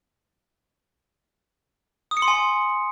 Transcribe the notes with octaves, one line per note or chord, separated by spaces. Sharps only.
D#6
C#7
C6
G#5